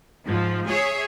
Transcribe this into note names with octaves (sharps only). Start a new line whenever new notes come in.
G#2 F3
G#4 C#5 E5